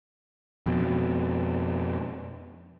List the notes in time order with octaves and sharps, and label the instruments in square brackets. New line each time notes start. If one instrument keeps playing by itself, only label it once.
[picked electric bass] F2 B2